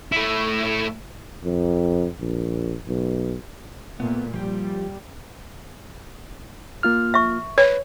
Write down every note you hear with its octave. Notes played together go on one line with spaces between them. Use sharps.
A3 E4
F2
A#1
B1
A#2 A3 B3
F3 G3 G4
A#3 F4 F6
E5 C#6
B4 C#5